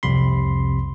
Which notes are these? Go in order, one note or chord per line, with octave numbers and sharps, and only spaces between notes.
C2 F2 C3 B5 C6